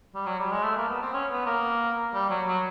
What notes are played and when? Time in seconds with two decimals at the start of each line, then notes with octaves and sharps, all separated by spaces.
0.15 G3
0.26 F#3
0.40 G3
0.52 G#3
0.63 A3
0.76 A#3
0.89 B3
1.02 C4
1.14 C#4
1.31 B3
1.46 A#3
2.14 G3
2.30 F#3
2.47 F#3